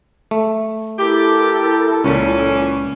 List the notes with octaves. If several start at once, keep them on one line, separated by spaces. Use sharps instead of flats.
A3
E4 G4 A4 A#4
C#2 A#2 E3 C#4